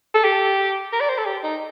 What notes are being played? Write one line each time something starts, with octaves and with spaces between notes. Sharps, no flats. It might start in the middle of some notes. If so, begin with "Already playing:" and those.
A4
G4
A#4
D5
C5
A4
G4
D#4